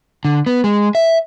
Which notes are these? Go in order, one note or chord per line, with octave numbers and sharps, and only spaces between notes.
D3
B3
G#3
E5